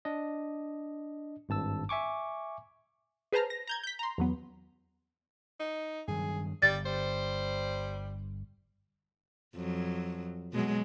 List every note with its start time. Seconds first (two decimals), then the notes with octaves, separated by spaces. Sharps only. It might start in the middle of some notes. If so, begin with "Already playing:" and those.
0.05 D4 D#5
1.49 G#1 G2 A5 E6
1.89 E5 G#5 C#6 D6
3.33 G#4 B4 C5 A5 A#5 F6
3.50 A#6
3.67 A#5 G6 G#6
3.83 G6 B6
3.99 A#5 C6
4.18 E2 F#3 B3
5.60 D#4
6.08 G2 D#3 F#3 G#4
6.62 G1 G3 D5 A6
6.86 G3 C5
9.56 F2 F#3
10.53 B2 F#3 G#3